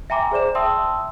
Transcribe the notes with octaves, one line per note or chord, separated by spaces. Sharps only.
E5 G5 G#5 A#5 C6 D6
G#4 C5 D5 E7
E5 G5 A5 C6 D#6 E6